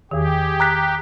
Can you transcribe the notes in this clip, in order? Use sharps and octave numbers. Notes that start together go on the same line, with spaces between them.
E2 D#3 G4 G#4
A#5 F#6 B6